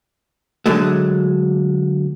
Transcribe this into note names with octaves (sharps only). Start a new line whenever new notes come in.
D3 F#3 G#3 A3